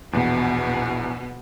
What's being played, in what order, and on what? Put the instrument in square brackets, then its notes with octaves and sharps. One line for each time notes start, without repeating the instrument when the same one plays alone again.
[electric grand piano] A#1 E2 [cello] B2 B3